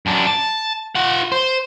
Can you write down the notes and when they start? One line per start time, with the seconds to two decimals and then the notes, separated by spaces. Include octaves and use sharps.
0.06 F#2 D4
0.27 A5
0.95 F4 F#5
1.32 C5